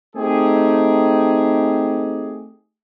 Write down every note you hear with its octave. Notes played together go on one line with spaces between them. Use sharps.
A3 C4 D#4 G4 G#4